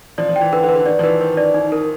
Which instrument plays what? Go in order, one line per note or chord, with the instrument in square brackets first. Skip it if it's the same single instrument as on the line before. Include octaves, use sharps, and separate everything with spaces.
[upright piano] F3 [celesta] D5
[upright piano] F3
[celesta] G5
[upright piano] E3
[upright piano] D3 [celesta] B4
[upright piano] D3
[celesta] B4
[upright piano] D3
[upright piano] D#3 [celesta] D5
[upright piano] F3
[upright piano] E3 [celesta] B4
[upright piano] D#3 [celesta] B4
[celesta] D5
D#4
A#4